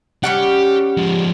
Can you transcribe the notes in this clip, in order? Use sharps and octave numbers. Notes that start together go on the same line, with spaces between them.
G3 C#4 G4 F#5
F3 G#3